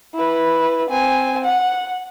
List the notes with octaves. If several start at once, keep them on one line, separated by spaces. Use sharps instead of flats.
E4 B4
C4 G#5
F#5